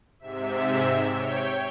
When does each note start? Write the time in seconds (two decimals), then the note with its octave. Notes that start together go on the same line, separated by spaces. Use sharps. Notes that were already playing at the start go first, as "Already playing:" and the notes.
0.19 G#2 C3 E5
1.09 C#5 G5